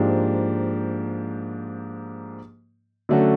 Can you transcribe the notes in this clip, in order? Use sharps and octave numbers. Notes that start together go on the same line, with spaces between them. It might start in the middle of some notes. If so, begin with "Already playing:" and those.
Already playing: G#2 F3 A#3 D4 G4
D3 F#3 A3 C#4 F#4